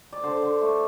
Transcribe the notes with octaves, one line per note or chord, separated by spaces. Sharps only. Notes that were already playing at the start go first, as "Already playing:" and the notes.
D5
D3 C5
D3
A3